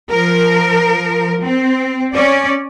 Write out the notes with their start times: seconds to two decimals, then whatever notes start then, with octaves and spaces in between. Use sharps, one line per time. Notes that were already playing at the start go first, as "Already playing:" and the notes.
0.10 F3 A#4
1.40 C4
2.13 C#4 D5